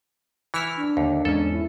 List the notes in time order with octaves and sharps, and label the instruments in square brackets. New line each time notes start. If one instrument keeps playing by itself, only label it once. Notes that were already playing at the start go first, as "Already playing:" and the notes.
[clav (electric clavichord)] E3 E4 [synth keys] C#6 F6 B6
[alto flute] D4
[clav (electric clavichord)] D#2 [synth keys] D3
[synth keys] E2 G#2 C#4 [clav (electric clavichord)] A4
[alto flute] E4